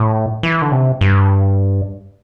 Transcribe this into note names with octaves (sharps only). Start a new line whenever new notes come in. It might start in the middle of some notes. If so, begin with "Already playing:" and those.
Already playing: A2
E3
D3
C3
G2